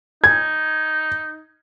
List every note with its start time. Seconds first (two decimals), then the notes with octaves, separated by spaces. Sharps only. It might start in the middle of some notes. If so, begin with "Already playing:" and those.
0.24 D#4 G#6